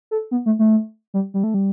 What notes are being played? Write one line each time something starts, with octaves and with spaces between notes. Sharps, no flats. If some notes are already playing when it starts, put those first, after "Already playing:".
A4
B3
A3
A3
G3
G3
A3
G3